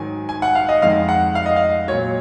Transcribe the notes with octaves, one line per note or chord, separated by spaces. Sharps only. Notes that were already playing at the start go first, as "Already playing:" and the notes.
Already playing: G#2 D#3 F#3 G#5
G#5
F#5
F5
D#5
F2 D#3 G#3 F5
F#5
F5
D#5
F5
A#2 F#3 C#5